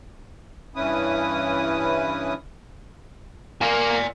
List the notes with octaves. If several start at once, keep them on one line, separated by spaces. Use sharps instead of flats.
G2 E3 C#4 E4 B4 D#6
A#3 A#4 D5 G#5